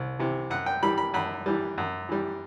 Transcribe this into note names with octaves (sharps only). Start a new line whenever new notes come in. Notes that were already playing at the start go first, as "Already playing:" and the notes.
Already playing: C2
C3 E3
F#2 F#5
G5
E3 G3 B5
B5
F#2 B5
E3 G3
F#2
E3 G3